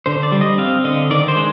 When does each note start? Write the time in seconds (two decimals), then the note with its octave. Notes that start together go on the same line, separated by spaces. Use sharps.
0.06 D3 C5
0.23 D5
0.32 G3
0.41 D#5
0.58 C4 F5
0.84 D3 D#5
1.10 D#3 D5
1.28 C5
1.36 G#3